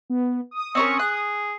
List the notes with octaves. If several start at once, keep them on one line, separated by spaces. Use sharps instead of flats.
B3
D#6
C4 C#4 A#4 C#6
G#4 F#6